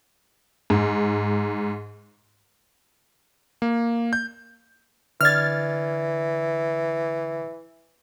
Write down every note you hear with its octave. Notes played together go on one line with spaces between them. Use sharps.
G#2
A#3
G6
D3 E3 D5 F6 G#6 A6